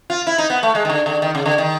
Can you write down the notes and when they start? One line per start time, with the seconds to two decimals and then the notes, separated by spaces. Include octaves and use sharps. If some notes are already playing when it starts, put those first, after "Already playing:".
0.10 F4
0.27 E4
0.38 D#4
0.50 B3
0.63 A3
0.75 G#3
0.85 D#3
0.90 D3
1.06 D3
1.22 D#3
1.35 C#3
1.46 D3
1.58 D#3